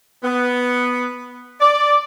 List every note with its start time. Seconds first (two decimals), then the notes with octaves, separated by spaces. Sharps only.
0.23 B3
1.60 D5